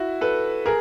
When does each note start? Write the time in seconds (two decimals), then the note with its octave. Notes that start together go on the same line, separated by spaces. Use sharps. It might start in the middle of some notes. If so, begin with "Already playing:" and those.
Already playing: E4 F#4
0.21 A4 B4
0.66 G#4 A#4